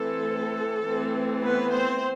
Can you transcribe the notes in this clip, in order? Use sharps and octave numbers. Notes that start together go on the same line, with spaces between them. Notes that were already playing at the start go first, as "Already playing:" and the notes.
Already playing: E3 A3 C4 A4
E3 A3 C4
B3 B4
C4 C5